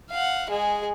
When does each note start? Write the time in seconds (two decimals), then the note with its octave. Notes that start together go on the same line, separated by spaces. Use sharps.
0.11 F5 F#5
0.50 G#3 G#4